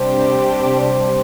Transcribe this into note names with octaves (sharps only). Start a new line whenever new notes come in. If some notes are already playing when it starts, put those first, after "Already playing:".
Already playing: C3 G3 D4 G4 C5
C5